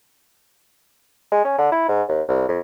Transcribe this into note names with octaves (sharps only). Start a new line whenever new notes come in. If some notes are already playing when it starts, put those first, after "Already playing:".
G#3
C#4
D3
E4
G#2
D#2
C2
F2